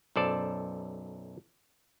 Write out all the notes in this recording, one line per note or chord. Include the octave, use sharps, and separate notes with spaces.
B1 F#2 A4 C5 D5 A5